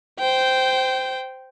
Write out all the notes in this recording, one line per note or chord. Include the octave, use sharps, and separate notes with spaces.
C5 G5